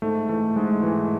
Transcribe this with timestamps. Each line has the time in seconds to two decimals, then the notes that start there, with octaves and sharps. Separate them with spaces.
0.02 G#2 A3
0.29 E3 A3
0.56 G#2 G#3
0.83 E3